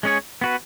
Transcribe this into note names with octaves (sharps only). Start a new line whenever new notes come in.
G#3 C#4 G#4 C#5
B3 F#4 B4